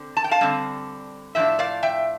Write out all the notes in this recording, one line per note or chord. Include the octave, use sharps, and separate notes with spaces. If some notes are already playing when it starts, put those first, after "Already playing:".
Already playing: D3 C4
A5
G5
F5 A5
D3 G3 C4
A2 F3 A3 D4 E5 G5
D5 F5
E5 G5